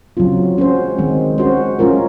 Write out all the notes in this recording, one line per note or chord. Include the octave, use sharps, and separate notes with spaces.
C#3 F#3 C4 F4
G#3 C#4 F#4 C5
D#3 G#3 C4
G#3 C#4 F#4 C5
G#3 C#4 F4 A#4